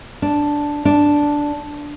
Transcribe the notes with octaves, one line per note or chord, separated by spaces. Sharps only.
D4
D4